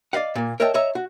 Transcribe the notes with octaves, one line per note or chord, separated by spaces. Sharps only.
D5 D#5 F5 F#5
A#2 A#3
A#4 C#5 D#5 E5 G5 A5
C#5 D#5 E5 A#5
F#4